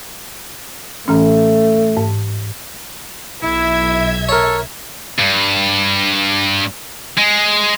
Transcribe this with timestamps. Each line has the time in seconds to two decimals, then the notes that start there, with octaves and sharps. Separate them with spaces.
1.08 A2 E3 A3 C#4
1.97 G#2
3.43 B1 E4 E5 G#6
4.29 A4 A#4 C#5
5.19 G2
7.18 G#3